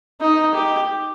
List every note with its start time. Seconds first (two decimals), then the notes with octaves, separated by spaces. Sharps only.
0.21 D#4
0.54 G4